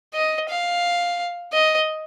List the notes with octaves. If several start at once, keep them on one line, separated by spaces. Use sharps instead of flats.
D#5
F5
D#5